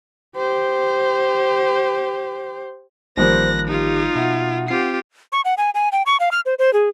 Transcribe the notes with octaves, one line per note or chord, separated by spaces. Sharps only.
G4 C5
A1 D#3 F3 G3 A#3 C5 F#6 A#6
D#4 F4 G4
B2 E5 F#5
C4 F4 G4 C7
C#6
F#5
G#5
G#5
G5
C#6
F5
F6
C5
C5
G#4